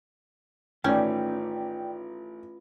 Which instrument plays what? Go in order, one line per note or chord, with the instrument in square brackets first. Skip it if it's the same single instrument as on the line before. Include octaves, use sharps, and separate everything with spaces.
[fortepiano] A1 D#3 [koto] C#4 [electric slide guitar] F4 B4 [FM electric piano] D5 G5